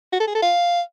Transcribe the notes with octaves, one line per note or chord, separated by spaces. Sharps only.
F#4
A4
G#4
A4
F5